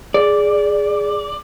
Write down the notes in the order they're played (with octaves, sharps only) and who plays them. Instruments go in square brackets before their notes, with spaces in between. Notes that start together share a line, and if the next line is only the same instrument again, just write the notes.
[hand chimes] G#4 [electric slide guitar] D5